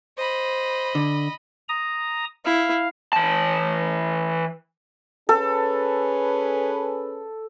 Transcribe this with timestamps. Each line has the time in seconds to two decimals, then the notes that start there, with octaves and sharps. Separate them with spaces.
0.18 C5 D#5 B5
0.95 D3
1.69 A#5 D#6
2.45 E4 F5
3.13 E3 A5
5.29 C#4 G#4 A4 B4